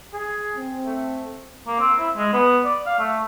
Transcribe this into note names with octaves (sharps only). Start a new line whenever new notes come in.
G#4
C4
A3
A#3
C4
E4
G#3
B3
D5
F5
A3